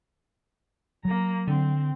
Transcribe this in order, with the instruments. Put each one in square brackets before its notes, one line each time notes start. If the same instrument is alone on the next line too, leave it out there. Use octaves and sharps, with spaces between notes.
[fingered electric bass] F#3 [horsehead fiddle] A#3 A#5
[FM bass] D3 [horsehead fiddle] C4